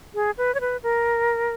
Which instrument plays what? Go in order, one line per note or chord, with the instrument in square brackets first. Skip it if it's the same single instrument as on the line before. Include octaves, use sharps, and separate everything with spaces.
[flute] G#4
B4
C#5
B4
A#4